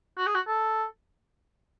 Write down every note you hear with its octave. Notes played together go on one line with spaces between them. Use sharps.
F#4
G#4
F#4
A4